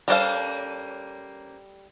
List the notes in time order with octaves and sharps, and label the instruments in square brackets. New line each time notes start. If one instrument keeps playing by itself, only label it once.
[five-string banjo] G3 A4 F5 [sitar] A#3 C#4 C5